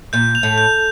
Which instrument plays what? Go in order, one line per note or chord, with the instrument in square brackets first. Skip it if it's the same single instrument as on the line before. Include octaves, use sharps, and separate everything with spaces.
[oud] A#2 [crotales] G6
[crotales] F7
[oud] A2
[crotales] G6